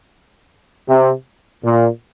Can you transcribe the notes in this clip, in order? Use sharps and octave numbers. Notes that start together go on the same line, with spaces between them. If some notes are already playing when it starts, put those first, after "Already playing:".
C3
A#2